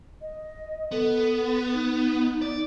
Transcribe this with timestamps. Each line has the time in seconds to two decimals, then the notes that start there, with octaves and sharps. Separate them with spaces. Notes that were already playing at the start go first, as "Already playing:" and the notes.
0.21 D#5
0.92 B3 A4
1.73 D#4
2.42 D5